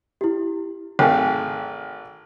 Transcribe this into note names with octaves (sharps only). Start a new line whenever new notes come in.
E4 G4
G#1 A3 F5 G5 G#5